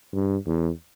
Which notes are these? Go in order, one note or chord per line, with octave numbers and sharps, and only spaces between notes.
G2
E2